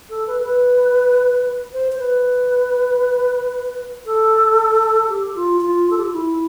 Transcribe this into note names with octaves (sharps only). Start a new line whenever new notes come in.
A4
B4
A4
B4
C5
C5
B4
A4
G4
F4
F4
A4
G4
F4
E4